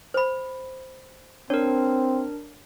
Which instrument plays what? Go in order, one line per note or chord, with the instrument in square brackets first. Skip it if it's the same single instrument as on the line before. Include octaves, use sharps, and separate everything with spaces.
[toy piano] C5 B5
[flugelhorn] C4 [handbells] D4 A#4 [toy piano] C#5